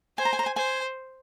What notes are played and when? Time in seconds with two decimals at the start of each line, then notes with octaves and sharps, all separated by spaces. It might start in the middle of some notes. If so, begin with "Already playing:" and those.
0.18 C5 G#5
0.25 A#5
0.33 G#5
0.39 A#5
0.46 G#5
0.56 C5 G#5